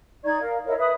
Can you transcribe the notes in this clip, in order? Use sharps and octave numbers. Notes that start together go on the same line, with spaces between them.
D#4 D5 C#6 G#6
A#4 F5
E4 A#4 C#5 D#5
B4 E5 B5 D#6